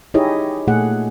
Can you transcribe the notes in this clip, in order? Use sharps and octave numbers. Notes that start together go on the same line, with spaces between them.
D#4 E4 G4 G#4 C#5 D#5
A#2 A3 G#4 F#5